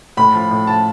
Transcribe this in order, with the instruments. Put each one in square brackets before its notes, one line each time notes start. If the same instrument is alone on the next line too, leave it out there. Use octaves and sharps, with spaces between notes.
[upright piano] A2 B5
F3
A2
F3 A5